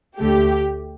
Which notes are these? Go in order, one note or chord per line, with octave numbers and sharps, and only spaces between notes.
D2 D3 A3 G4